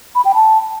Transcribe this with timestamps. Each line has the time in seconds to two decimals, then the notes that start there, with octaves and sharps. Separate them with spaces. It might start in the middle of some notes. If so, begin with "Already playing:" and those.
0.15 B5
0.25 G5
0.35 A5